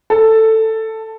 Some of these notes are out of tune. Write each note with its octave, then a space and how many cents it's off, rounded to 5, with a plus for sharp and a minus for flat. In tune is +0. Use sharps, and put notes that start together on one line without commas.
A4 +10